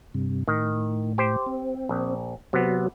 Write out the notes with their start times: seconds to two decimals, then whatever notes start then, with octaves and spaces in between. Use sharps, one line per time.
0.14 G2 C3
0.48 A2 D#3
1.18 G4 C5
1.46 C4
1.89 A#1
2.53 C3 F#3 B3